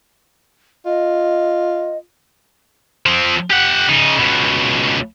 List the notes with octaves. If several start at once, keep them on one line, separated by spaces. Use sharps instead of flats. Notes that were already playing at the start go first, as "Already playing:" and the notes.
F4 D#5
F3 C4
G4 F#5
C#3 D#4
C#2 B2